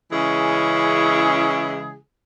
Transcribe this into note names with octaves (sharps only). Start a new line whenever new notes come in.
C#3 E3 G#3 C#4 E4 G#4